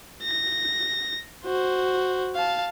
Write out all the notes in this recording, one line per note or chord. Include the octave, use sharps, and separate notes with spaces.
A#6
F#4 C5
F5 A5